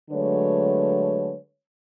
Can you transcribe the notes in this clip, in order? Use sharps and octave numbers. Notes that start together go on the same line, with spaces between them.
D3 F#3 G#3 A3 B4 C#5